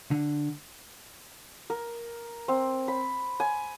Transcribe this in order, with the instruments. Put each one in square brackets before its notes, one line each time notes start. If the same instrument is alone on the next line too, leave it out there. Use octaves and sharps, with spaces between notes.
[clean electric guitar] D3
[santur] A#4
C4
B5
G#5